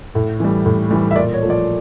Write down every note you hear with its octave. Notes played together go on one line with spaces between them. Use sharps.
A2
E3 G3
A2
E3 G3
E5
A#2 D5
C#5
F3 A3
D5